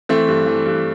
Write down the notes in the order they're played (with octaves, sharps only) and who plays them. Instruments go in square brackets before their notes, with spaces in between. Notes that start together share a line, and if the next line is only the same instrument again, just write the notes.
[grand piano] E3 A3 C4
G2
E3
G2